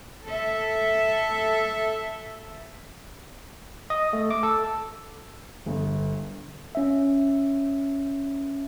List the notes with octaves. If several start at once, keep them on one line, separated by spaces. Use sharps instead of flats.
A4 E5
D#5
A3
D6
A4
G1
C#4 E5